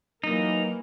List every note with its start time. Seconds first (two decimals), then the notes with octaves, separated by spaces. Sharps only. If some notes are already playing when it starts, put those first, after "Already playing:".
0.24 E3 F#3 A#3 D#4 A#4